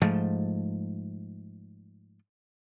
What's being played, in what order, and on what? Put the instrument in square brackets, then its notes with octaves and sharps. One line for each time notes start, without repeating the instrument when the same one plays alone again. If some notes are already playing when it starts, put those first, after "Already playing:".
[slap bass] G#2 F3 A3